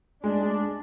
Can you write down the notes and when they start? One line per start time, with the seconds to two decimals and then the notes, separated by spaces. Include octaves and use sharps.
0.24 G#3 D4
0.42 G#3